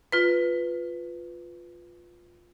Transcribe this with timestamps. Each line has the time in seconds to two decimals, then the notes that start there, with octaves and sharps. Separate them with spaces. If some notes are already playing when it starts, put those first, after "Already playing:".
0.12 F4 B4